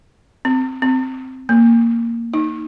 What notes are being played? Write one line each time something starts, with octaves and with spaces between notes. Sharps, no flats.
C4
C4
A#3
D#4